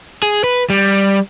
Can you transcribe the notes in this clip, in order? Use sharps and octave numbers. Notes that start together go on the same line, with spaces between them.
G#4
B4
G3